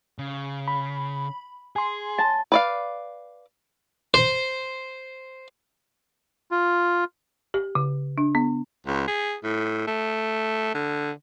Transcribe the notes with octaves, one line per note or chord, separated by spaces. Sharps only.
C#3
B5
G#4 G#5 C6
A5
B4 D5 F5
C5
F4
G4
C#3
D4
B3
C#2
G#4
A2
A3
D3